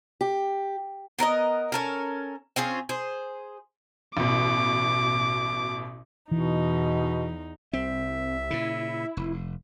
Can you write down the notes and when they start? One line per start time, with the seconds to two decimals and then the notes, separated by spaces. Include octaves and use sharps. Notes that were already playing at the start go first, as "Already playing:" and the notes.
0.21 G4
1.19 B3 A#4 C5 D#5
1.72 C#4 A4 A#4
2.56 C4 C#4 F4 G#4
2.89 G#4 C5
4.17 A1 B2 D6
6.31 E2 B2 E3 D#4
7.73 C2 C4 E5
8.51 A#2 C#3 E4
9.17 F1